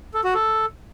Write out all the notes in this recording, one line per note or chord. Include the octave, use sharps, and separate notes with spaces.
A4
F#4
A4